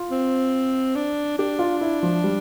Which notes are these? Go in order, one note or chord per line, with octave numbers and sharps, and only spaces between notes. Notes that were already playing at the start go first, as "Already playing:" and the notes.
Already playing: F4
C4
D4
D4 G4
F4
E4
F3
G3